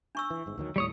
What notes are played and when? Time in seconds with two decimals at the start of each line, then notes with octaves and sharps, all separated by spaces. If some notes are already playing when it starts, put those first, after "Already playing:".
0.15 D4 C#6 E6
0.30 E3
0.46 G1 G#2
0.57 D2 D#3 F#3
0.76 D#2 A2 G3 C#5 D#6